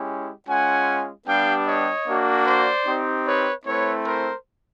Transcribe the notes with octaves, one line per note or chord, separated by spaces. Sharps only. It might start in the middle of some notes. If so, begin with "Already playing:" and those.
Already playing: G#3 C#4 E4 G4
G#3 C#4 F4 F#5 G#5
G3 B3 D4 G4 F5 G5
C#5 D#5
A#3 D4 F#4
C5 D5
C4 D#4 G4
B4 C#5
A3 C4 E4 B4 C#5
A#4 C5